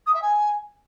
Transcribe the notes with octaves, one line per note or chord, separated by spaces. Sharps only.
D#6
E5
G#5